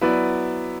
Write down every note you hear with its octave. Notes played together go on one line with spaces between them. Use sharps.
F#3 B3 E4 B4 D5